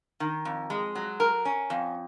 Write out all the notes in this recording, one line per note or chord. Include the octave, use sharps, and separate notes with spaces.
D#3
F2
G#3
F#3
A#4
C#4
F2